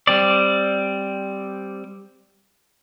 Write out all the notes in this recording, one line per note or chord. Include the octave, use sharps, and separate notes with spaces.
G3 C4 D5